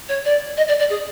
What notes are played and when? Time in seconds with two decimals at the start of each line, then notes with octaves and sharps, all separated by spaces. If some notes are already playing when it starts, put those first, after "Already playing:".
0.08 C#5
0.25 D5
0.57 D#5
0.68 D5
0.79 D5
0.89 G#4